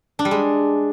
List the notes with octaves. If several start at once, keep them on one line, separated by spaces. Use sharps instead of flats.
D4
G3
G#3